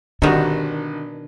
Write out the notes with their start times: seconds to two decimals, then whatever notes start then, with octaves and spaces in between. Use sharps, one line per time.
0.22 G#1 B2 D3 D#3 G3 D4 F#4